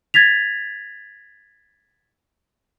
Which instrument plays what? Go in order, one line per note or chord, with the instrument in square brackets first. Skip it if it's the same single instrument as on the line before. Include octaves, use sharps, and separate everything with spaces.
[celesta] G#6 A6 B6 F7